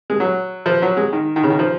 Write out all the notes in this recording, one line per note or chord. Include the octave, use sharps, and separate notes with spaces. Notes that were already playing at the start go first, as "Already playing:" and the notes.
G#3
F#3
F3
F#3
G#3
D#3
D#3
C#3
D#3
F3